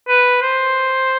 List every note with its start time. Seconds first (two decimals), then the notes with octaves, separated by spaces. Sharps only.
0.09 B4
0.42 C5